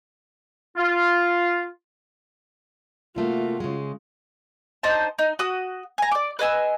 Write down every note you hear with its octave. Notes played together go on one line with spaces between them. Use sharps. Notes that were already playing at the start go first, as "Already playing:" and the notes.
F4
C3 A3 A#3 F4 F#4
C#3 G#3
D4 D#4 C5 A5
D#4
F#4 D#6
G#5 A#5
D5 D6
B4 D#5 G#5 E6